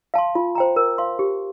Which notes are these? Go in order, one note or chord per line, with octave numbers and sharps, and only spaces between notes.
F5 A5 C6
F4
C5 G5 A#5
A#4
F5 C6
G4